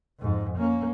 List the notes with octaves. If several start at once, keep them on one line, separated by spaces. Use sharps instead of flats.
F2 G#2
A#3 C#4